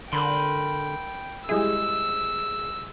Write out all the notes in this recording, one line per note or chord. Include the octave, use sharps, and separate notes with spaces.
D3 A#4 G5 B5 C6
G3 G#3 E4 G#4 E6